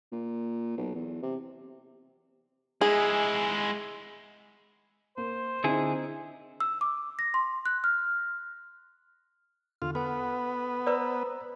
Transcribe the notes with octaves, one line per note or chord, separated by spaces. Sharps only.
A#2
B1
E2
C3
G#3 E4 G#4
A#3 C5
D3 C4 D#4 E4 G#4
E6
D6
A#6
C6
F#6
F6
E2 D3 F4
B3 A4 F#5
B4 C5 D5 A#5 E6